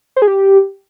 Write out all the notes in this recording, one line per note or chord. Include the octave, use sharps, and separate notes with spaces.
C5
G#4
G4